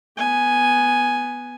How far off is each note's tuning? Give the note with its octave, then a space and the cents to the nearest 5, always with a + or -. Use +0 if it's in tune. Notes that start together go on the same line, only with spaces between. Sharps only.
B3 +0 G#5 +0